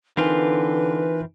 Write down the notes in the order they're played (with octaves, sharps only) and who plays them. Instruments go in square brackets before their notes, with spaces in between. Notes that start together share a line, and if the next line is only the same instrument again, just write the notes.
[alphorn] D3 [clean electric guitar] E3 C4 F4 [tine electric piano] D#4 A#4 G#5 [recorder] B4